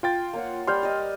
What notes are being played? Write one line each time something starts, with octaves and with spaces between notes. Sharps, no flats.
F4 G5 A6
A#3 C#5 F#5
G3 B5 C6 F6 G6
D5 D#5